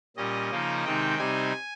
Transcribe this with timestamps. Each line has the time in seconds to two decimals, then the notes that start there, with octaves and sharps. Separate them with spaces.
0.17 A#2 G3 C#4 D#5
0.51 C#3 F3 A#3 D#4
0.85 C3 D#3 G#3 C4 D#4 G5
1.19 C3 G3 C4 D#4 G#5